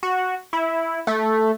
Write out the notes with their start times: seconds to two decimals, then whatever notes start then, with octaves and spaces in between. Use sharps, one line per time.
0.03 F#4
0.53 E4
1.07 A3